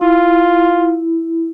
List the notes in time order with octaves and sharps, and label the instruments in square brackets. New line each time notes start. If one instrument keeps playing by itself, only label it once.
[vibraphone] E4 [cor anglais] F4